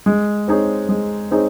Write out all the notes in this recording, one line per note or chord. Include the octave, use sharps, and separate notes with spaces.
G#3
C4 D#4 G#4 C#5
G#3
C4 D#4 G#4 C#5